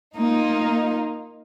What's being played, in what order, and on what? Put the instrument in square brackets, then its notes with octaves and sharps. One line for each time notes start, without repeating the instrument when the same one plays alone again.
[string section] A#3 D#4 F4